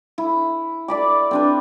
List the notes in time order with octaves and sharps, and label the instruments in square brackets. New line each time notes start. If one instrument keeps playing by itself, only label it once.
[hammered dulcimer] E4
D5 B5 D6
C4 D4 B4